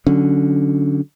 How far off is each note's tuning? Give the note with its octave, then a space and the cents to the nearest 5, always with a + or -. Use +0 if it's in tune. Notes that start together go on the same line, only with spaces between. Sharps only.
D3 +0 F#3 +0 C#4 +0